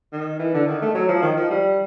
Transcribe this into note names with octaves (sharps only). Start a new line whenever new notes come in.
D#3
E3
D3
D#3
A3
F#3
F3
D#3
F3
G3